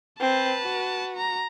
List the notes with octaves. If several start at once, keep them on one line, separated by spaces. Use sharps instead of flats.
C4 B4 A5
F#4
A#5